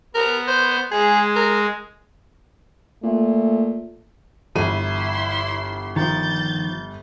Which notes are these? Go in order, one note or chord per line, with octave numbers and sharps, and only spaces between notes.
B3 A#4
C5
G#3 G#4
A#4
A#2 A3
G1 E3 E4 C6 D#7
D#3 F3 G6 A6